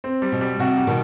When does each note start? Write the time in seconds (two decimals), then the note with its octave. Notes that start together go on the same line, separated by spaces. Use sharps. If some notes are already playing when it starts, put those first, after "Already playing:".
0.04 C4
0.22 G3
0.32 B2
0.41 G3
0.60 C3 F#4
0.78 G3
0.87 B2 D#3